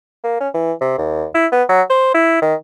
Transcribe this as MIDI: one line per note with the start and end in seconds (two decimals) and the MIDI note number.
0.24 0.38 58
0.40 0.49 61
0.54 0.73 52
0.81 0.93 48
0.98 1.26 39
1.35 1.47 64
1.52 1.63 59
1.69 1.82 54
1.90 2.13 72
2.14 2.39 64
2.42 2.54 51